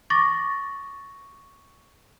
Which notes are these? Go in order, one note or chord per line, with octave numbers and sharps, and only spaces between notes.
C#6 D6 A6 A#6